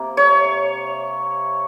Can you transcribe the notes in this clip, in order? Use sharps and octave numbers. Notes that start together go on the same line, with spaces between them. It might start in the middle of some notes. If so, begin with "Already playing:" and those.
Already playing: C3 A#3
C#5